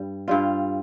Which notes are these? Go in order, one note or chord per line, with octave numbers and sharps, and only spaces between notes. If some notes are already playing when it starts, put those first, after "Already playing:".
Already playing: G2 G3
G2 G3 F4